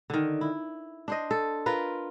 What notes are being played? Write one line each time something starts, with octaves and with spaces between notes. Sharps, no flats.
D3 D#3
E4
D4 C5 D#5
A4
F4 A#4 B4